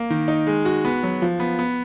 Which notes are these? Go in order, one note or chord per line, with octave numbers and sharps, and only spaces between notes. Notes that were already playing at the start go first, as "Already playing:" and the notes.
Already playing: A#3
D#3
D#4
G#3
F#4
B3
F#3
F3
B3
B3